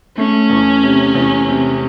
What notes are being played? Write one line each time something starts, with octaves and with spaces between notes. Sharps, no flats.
A3 C#4
E2
C3
E2
C3